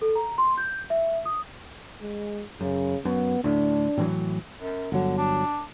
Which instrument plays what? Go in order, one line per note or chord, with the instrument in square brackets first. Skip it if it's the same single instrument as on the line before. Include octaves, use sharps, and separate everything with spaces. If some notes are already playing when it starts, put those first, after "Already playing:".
[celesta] A4
A#5
C6
G6
E5
D#6
[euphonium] G#3
[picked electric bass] F#2 [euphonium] C#3
[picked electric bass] F#2 [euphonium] B3
[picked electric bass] D2 A2 [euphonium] D4
[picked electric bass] A2 E3 F#3
[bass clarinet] F#2
[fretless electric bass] G1 F#3 [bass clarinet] D3
[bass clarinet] D4